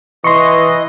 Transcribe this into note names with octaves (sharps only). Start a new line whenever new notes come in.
E3 D#5 C6 C#6